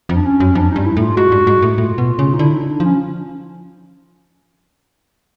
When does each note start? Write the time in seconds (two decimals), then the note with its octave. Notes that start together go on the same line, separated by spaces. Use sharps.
0.09 F2
0.16 D4
0.25 C#4
0.40 F#2
0.55 F2 D4
0.71 D#4
0.76 G2
0.86 E4
0.97 A2 F4
1.16 G#2 F#4
1.32 G2
1.47 G#2
1.62 A2
1.78 A2 F4
1.98 B2
2.19 C#3
2.34 D#4
2.39 D3 E4
2.54 D#4
2.70 D4
2.80 F3 C#4